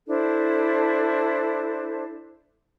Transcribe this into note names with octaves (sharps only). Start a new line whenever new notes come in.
D4 E4 A4 C5